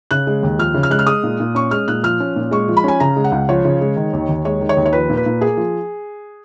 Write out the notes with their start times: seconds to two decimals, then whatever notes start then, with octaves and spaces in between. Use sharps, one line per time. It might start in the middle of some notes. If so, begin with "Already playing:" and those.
0.11 C#3 F#6
0.27 G#3
0.43 D#2
0.59 F3 F6
0.74 C#3
0.83 F6
0.90 G#3 F#6
0.99 F6
1.07 G#3 D#6
1.23 A#2
1.40 A#2
1.55 C#4 C#6
1.71 G#3 F6
1.88 A#2 F#6
2.03 F3 F6
2.20 C#4
2.36 A#2
2.51 G#3 C#6
2.68 F3
2.77 B5
2.84 C#4 G#5
3.00 C#3 A#5
3.16 G#3
3.24 F#5
3.32 C#2
3.49 F3 C#5
3.65 C#3
3.81 G#3
3.96 D#3
4.13 D#2
4.29 D#2
4.45 G#3 C#5
4.61 D#3
4.69 C#5
4.77 D#2
4.86 C#5
4.93 F3 B4
5.10 A#2
5.17 B4
5.26 A#2
5.41 A#3 G#4
5.57 F3